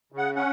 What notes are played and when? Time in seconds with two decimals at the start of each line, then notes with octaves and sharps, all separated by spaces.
0.12 C#3
0.18 F#5
0.36 C#4 F#5